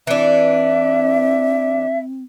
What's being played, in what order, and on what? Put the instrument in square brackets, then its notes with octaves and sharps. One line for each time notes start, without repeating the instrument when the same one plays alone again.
[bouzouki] E3 D4 [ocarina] C4 [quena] E5